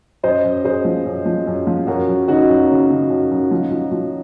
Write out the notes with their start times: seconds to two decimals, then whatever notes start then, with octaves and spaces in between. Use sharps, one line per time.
0.23 F#2 C5 D#5
0.44 F#2
0.64 F#2 G#4 C5
0.85 F3
1.06 F#2
1.26 F3
1.47 F#2
1.67 F3
1.87 F#2 F#4 A#4
2.08 F#2
2.28 C#3 D#4 F#4
2.49 F#2
2.70 C#3
2.90 C#3
3.10 F#2
3.31 F#2
3.51 F3
3.71 F3
3.91 F3